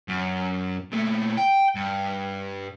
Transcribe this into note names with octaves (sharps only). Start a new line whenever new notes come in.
F#2
A#2 A3
G5
G2